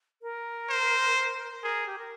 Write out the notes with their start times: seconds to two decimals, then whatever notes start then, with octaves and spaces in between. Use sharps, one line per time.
0.22 A#4
0.69 C5
1.62 G#4 A#4
1.87 G4
1.99 A#4